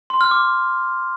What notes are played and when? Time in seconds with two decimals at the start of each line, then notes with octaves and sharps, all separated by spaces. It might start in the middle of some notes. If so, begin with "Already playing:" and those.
0.10 C6
0.21 F6
0.31 D6